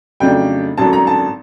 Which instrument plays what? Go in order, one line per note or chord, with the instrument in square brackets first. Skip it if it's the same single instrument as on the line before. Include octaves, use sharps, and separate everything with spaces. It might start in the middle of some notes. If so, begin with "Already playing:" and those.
[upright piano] F2 C#3 F#3 A3 D4 G5
G#1 F#2 D3 F#3 A5
A#5
A5